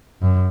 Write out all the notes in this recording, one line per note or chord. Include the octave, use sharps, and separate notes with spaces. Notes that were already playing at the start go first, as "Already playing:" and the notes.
F#2